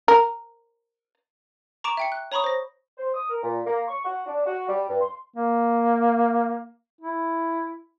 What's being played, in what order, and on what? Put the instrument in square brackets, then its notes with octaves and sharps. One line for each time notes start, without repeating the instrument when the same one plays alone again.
[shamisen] A#4
[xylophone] A#5 C#6 D6 D7 E7
E5 G5 C#7
F#6
C#5 A#5 B5 C#6 D#6
C5 A#6
[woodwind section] C5
D#6
A#4
A#2
A#3
C#6
F#4
D4
F#4
G3
G2
C6
[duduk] A#3
E4